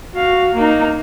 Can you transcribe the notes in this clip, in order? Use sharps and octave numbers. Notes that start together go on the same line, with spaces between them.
F#4 F5
A#3 D#4